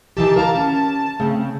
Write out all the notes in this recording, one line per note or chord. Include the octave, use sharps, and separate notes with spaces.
D#3 E3 G4 A5
A#4 F5 A#5
C#4
C#3 A3 C4